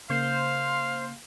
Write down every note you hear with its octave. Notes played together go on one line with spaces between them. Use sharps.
C#3 A#3 C5 F5